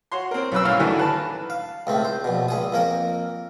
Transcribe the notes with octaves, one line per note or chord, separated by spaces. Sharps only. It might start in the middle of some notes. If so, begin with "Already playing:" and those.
F#4 C#5 C6
C4 A#4
B1 C#4 B4 E6
A1 G2 C#4 F5 F6
D#3 E3 A3 D4 F#4
B4 A5
F5
C#2 A2 C4
C5
A#1 B2
C#2 G#4 D#6
F2 A#3 A#4